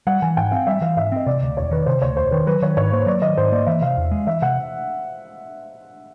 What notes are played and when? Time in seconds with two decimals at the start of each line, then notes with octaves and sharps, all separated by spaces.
0.07 G3 F#5
0.22 E3 G#5
0.37 G#2 G5
0.51 C4 F5
0.67 G3 E5
0.81 E3 F5
0.96 G#2 E5
1.12 C4 D#5
1.26 C3 D5
1.42 D2
1.57 E1 C#5
1.71 D#3 B4
1.86 C3 C5
2.02 D2 C#5
2.17 E1 C5
2.31 D#3 B4
2.47 F#3 B4
2.62 D#3 C#5
2.77 G#2 C#5
2.92 A#3 C5
3.06 F#3 D5
3.22 D#3 D#5
3.37 G#2 C5
3.52 A#3 D5
3.67 E3 E5
3.82 C3 F5
3.97 E2
4.11 G#3
4.27 E3 E5
4.42 C3 F#5